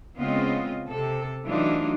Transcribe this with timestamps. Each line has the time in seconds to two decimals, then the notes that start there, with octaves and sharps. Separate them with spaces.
0.18 C#3 G#3 B3 C4 F4 D#5
0.86 C3 A4
1.44 E3 F#3 A3 D4 D#4 F4